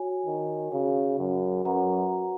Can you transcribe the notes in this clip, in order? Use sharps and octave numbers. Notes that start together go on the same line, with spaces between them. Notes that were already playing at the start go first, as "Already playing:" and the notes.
Already playing: F#4 C#5 G#5
D#3
C#3 F#4 C#5 F5
F#2
F#2 F#4 B4 F#5 A#5